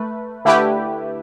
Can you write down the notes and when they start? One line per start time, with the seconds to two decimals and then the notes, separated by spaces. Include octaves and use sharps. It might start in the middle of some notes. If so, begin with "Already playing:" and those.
Already playing: A3 B4
0.45 D3 A3 E4 G4 B4